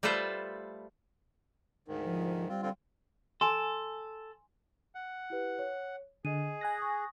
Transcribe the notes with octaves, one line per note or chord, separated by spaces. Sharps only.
G3 A3 F4 A4 B4 C5
D2 G#2 D#3
F3
G3 C4 F4
D3 C4 F4
A4 G#5 C6
F#5
E4 G4 B4
C#5
D3 G#4 D#5 D#7
G#5 F#6 A#6
C#6 D#6